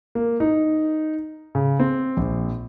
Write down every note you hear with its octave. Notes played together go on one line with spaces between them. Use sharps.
A#3
D#4
C#3
C4
A#1